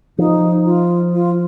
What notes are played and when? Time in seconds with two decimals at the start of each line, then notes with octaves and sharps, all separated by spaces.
0.18 F3 D#4
0.65 F4
1.13 F4